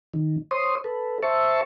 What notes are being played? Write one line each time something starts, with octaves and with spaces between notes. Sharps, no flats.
D#3
C5 C#5 C6 D#6
A4 B4
C5 E5 A5 C#6